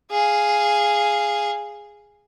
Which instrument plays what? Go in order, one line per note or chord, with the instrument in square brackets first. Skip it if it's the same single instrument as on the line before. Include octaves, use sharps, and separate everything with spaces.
[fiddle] G#4 F5